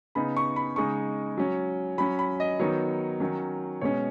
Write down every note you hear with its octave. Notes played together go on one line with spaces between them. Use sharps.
C#3 B3 D#4 B5
C#6
B5
C#3 G#3 D#4 C#6
F#3 C#4
F#3 C#4 B5
B5
D#5
D#3 F#3 B3 D#4 C#5
D#3 F#3 C#4
B2 G#3 C#4 C#5